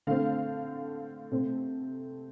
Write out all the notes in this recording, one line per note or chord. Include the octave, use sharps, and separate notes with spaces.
D3 A3 C4 F5
C3 A3 C4